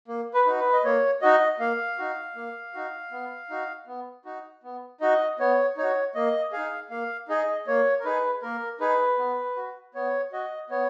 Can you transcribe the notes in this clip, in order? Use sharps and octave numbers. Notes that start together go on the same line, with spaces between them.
A#3
B4
D#4 F#4
B4
D#5
A#3 C#5
D#4 F#4 D#5
A#3 F5
D#4 F#4
A#3
D#4 F#4
B3
D#4 F#4
B3
D#4 F#4
B3
D#4 F#4 D#5
B3 C#5
D#4 F#4 C#5
A#3 D#5
D#4 G#4 F5
A#3 F5
D#4 G#4 D#5
A#3 C#5
A#4
D#4 G#4 B4
A#3 A#4
D#4 G#4 B4
B3
F#4
B3 C#5
F#4 D#5
B3 C#5